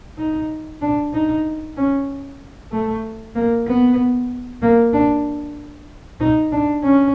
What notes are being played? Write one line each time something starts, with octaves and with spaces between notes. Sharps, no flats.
D#4
D4
D#4
C#4
A3
A#3
B3
A#3
D4
D#4
D4
C#4